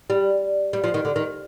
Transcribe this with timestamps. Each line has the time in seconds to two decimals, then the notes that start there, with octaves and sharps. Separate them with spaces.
0.10 G3
0.73 G3
0.84 F3
0.94 D#3
1.05 D3
1.16 D#3